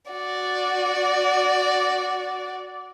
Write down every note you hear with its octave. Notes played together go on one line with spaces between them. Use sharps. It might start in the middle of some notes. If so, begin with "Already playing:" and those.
F#4 D5